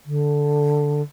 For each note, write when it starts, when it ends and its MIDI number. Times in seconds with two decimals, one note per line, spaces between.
0.06 1.02 50